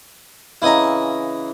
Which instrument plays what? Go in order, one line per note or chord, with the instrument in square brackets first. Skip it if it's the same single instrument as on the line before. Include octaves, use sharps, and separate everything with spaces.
[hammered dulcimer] C#3 E3 F5 [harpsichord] E4 D#5 A#5